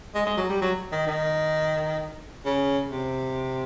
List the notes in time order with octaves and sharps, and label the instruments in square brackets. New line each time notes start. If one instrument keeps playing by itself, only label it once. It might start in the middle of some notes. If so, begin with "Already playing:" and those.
[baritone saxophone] G#3
G#3
F#3
G3
F#3
D#3
D#3
C#3
C3